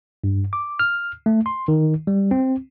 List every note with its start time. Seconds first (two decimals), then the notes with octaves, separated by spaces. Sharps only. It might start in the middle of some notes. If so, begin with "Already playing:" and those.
0.24 G2
0.53 D6
0.79 F6
1.26 A3
1.46 C6
1.68 D#3
2.07 G3
2.31 C4